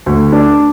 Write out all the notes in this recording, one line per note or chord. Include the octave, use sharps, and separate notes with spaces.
D2
D4